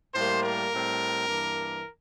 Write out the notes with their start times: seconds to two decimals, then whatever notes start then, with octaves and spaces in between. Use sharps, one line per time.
0.15 A2 G3 A#3 C5
0.42 A#4
0.70 A2 G3 C4
1.26 G2 E3 A#3